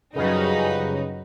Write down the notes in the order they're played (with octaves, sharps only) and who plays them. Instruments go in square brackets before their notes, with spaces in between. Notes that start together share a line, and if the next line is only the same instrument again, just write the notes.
[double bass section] F#2 [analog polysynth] C#3 [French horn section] F3 G3 G#4 [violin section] D#4 F#4 B4